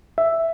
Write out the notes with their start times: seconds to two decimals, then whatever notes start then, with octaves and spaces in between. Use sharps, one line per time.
0.18 E5